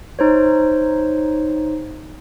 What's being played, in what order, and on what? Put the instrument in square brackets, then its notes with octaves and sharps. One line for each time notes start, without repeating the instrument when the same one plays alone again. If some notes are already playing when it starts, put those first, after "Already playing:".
[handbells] D#4 C5 C#5